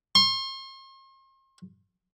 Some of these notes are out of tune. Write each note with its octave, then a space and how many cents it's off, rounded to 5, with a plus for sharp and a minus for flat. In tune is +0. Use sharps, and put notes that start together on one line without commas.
C6 +40